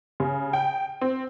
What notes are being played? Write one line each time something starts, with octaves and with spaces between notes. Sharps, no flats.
C#3
G5
C4